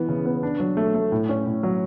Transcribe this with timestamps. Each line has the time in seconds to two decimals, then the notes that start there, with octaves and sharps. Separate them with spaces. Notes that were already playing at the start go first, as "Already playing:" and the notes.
Already playing: E3 B3
0.09 C#3
0.26 B3
0.43 D4
0.60 F#3
0.77 A3
0.94 A3
1.12 A2
1.29 C#4
1.46 A2
1.63 F#3